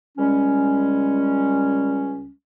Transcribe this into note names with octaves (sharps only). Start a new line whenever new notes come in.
C#2 G3 G#3 C#4